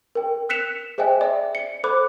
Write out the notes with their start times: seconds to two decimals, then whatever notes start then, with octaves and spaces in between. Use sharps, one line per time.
0.15 A#4 G5
0.49 E6 F#6 B6 C#7 E7 F7
0.98 G#4 C5 D#5 E5 G5 G#5
1.21 D5 E5
1.55 C#7
1.84 A4 C5 B5 D6 F#6